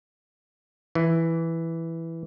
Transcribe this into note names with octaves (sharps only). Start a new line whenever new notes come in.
E3